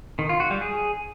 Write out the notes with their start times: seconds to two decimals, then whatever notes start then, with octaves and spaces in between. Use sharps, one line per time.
0.19 D#3
0.29 F4
0.40 F#4
0.51 G3
0.61 G#4